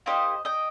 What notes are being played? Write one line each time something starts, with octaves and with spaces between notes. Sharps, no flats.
A#3 D#4 G4 C5 D#5
D#5 G5